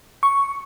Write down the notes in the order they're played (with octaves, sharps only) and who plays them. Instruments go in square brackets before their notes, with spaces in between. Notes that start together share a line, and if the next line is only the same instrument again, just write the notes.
[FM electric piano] C#6